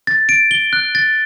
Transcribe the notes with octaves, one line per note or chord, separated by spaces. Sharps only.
A6
D7
G7
F#6
A6